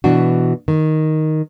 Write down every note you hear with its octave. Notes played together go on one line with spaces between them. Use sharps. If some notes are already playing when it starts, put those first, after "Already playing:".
B2 E3 D4 F#4
D#3